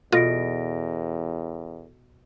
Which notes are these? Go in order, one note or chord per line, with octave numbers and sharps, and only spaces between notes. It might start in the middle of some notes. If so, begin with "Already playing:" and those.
E2 B2 F4 A4 A#6 D7